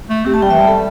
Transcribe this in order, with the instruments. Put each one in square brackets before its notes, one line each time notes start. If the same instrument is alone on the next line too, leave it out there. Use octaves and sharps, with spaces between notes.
[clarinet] A3
[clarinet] C4 [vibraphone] G4
[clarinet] A3 [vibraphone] A5
[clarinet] G3 [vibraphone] G5
[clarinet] E3 [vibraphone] E5
[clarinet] G3 [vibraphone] A5
[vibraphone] A4